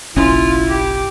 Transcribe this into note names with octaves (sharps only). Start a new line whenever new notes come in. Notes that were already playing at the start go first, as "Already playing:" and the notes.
F#1 B1 C#4 E4 F4
G4